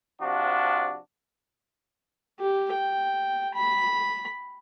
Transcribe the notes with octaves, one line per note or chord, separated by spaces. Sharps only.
C3 F3 D4 F#4
G4
G5
B5